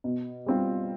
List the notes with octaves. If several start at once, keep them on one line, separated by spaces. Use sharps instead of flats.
B2
G3 C4 F4